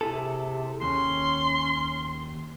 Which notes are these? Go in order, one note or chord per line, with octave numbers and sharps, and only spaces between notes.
C3 E4 G#4 A4
D#2 C#4 C6